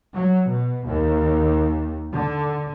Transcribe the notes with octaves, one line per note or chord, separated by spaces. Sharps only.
F#3
B2
D#2
D3